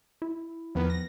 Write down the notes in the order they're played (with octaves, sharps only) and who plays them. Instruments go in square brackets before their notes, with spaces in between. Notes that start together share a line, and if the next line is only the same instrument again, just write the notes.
[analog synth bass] E4
[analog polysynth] E2 D#3 B3 [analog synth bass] F3
[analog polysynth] A#6